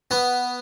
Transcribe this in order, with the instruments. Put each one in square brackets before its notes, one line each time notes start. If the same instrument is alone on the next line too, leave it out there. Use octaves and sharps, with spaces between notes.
[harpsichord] B3